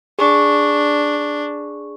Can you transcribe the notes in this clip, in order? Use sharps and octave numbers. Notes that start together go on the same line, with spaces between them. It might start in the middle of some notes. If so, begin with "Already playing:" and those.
D4 G#4 C#6